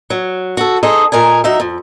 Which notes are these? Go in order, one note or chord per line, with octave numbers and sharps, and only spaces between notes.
F#3
F#4 A4
D#4 G#4 A4 C5 D#5
A#2 A#4 D#5 G#5
F#3 D#4 E5
F2